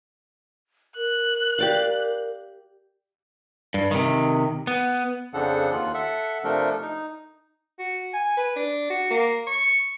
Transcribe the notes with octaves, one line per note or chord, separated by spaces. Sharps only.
A#4 F#6
G4 D5 F5
G2
C3 D#3
B3
F2 C#3 F3 D4 A4 F#5
D#2 F4 F#6
A4 E5 F#5
C3 F3 A3 D4 A4 A#4
D#4
F#4
G#5
B4
D4
F#4
A#3
C#6